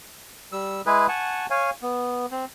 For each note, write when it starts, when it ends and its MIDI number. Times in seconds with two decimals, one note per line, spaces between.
0.52 0.82 55
0.52 0.82 88
0.86 1.07 56
0.86 1.07 64
0.86 1.07 68
0.86 1.07 71
1.08 1.46 78
1.08 1.46 80
1.08 1.46 81
1.08 1.46 85
1.50 1.70 73
1.50 1.70 77
1.50 1.70 80
1.82 2.26 59
2.31 2.45 60